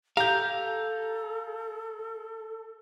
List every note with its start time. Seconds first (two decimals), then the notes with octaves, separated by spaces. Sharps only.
0.17 G4 A4 F5 A#5 G6